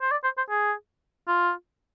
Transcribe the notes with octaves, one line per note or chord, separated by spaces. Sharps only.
C5
D5
C5
C5
G#4
F4